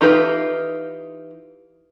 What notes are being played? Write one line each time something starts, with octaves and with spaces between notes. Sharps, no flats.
E3 D#4 F4 G4 B4